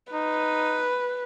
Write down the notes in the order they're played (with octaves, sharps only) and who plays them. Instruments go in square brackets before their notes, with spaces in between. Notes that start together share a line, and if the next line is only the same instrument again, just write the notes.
[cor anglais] D#4 [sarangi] B4